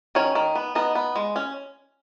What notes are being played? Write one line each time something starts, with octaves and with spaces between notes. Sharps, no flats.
D#3 C#4 C#5
D#3
B3
B3 D#4 D#5
B3
G#3
C#4